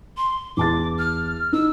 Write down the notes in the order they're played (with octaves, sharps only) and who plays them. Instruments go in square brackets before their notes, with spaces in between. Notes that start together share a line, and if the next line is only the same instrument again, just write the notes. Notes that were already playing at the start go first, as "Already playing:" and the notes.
[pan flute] C6
[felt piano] E2 A5 A6 [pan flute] D6
[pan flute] F6
[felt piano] D#4 [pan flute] E6